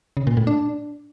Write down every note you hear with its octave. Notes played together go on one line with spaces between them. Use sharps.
C#3
A#2
A2
D4